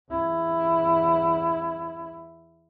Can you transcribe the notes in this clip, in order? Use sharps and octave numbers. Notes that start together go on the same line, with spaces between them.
E2 E4